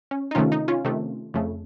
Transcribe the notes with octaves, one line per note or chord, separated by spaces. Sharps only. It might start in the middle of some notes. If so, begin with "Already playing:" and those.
C#4
D#4
C3 D#3 A3 C#4 F4
D#4
C#4 F4
C3 D#3 A3
F2 C#3 A3